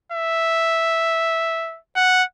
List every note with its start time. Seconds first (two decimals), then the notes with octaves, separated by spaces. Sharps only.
0.12 E5
1.96 F#5